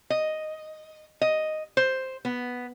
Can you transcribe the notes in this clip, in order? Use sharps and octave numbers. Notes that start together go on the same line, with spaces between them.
D#5
D#5
C5
B3